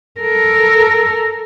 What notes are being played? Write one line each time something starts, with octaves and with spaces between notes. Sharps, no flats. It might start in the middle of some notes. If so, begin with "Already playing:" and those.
A4 A#4